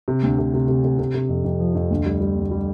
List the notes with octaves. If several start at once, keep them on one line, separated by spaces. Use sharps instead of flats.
C3
D2
C3
C3
C3
C3
C3
C3
F2
F2
F3
F2
D2
G3
G3
D2
G3